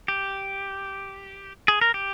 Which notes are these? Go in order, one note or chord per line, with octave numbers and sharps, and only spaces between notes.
G4
G#4
A#4
G4